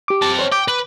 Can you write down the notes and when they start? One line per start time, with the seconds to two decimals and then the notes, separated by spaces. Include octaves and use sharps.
0.08 G4 D6
0.22 C4 A5
0.39 C5 C#5
0.52 G5 D6
0.68 B4